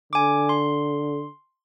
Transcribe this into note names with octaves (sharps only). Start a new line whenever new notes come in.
D3 G#5 D6
C6